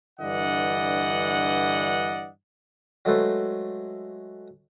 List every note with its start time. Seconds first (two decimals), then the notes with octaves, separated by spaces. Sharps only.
0.20 G2 D3 E3 D5 D#5 F#5
3.05 F#3 G#3 A3 A4 B4 C5